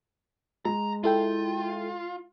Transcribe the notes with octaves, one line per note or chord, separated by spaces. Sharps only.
G#3 A#5
E4 F4 A4 G5